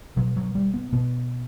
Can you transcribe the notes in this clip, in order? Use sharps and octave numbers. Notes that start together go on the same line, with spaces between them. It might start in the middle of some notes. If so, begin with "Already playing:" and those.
B2 F#3
F#3
G3
B3
B2 B3